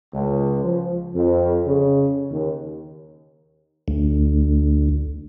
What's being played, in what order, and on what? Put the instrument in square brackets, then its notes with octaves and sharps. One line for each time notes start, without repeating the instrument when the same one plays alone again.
[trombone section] C#2
F3
F2
C#3
D#2
[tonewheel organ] D2